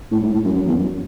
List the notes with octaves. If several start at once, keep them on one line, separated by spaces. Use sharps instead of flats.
A2
G#2
A2
F#2
F#2
E2
F#2